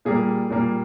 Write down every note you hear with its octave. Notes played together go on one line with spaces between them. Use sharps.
A#2 G3 A#3 G#4
A#2 G3 A#3